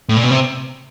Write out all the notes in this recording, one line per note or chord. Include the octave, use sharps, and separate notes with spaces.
A2
A#2
B2
C3